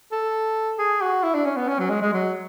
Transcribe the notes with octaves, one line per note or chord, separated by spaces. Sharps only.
A4
G#4
F#4
E4
D4
C#4
B3
C#4
F#3
G#3
G#3
F#3